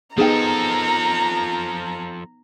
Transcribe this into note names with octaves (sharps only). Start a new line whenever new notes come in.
F3 B3 D#4 G#4 A4 G5 A#5